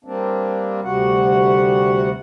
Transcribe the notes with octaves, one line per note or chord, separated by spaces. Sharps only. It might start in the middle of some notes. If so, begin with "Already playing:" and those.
G3 A#3 C4 D4
D2 C3 G3 F#4 F#5